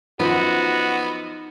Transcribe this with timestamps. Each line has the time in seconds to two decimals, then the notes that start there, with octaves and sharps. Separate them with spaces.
0.20 F#2 F3 B3 D#4 F#4